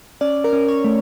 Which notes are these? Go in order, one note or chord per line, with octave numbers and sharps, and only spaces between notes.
C#4 D5
A#4
C#4
C#5
A3